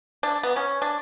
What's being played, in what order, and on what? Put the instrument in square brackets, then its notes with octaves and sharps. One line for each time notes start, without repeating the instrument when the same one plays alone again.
[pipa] D4
B3
C#4
D4